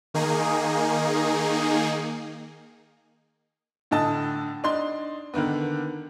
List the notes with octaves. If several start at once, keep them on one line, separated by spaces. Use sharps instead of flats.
D#3 A#3 D#4 G#4
A2 D3 D#5 A5
D4 D#4 C6
D3 D#3 A#3 B3